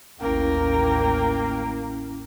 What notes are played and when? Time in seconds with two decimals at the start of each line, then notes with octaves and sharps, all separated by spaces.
0.21 A1 D#2 A#3 C#4 E4 A#4 G5